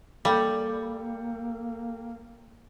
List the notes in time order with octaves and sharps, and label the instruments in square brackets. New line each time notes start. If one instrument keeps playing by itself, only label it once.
[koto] G3 [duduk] A#3 [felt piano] A4 G5